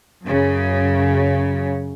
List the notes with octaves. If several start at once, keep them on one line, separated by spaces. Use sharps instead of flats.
F#2 C#3